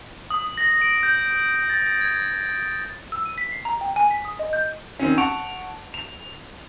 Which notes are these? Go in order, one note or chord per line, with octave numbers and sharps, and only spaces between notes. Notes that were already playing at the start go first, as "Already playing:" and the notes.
D#6
A#6
D7
G6
A6
G#6
E6
D#7
B6
C7
A#5
G5
G#5
B6
D#6
D#5
G6
D#3 C4 C#4
F#5 A5 C#6 D7 F7
F7